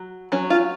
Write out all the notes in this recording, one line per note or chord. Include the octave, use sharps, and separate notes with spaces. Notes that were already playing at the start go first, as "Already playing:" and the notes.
Already playing: F#3
F#3 C#4
F4